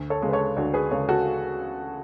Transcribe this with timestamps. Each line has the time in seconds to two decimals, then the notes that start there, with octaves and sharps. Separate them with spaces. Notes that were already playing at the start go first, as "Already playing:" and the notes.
Already playing: D2
0.10 A4 C#5
0.22 C#3 G#3
0.29 B4
0.33 A4 C#5
0.56 D2 D4 F#4
0.74 G#4 B4
0.91 C#3 G#3 A4 C#5
1.09 F#4 A4